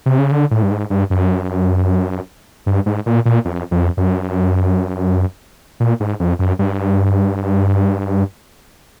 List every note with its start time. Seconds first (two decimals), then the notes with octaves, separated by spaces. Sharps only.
0.06 C3
0.19 C#3
0.32 D3
0.51 A2
0.63 G2
0.71 G#2
0.90 G2
1.10 F#2
2.66 G2
2.86 G#2
3.06 A#2
3.25 A#2
3.45 F2
3.71 F2
3.97 F#2
5.80 A#2
6.00 G#2
6.20 F2
6.39 F#2
6.59 G2